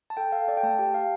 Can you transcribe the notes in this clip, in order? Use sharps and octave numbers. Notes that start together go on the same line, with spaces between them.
A5
A4 G5
A4 F5
A4 D5
G5
A3 A5
G4 G5
G4 F5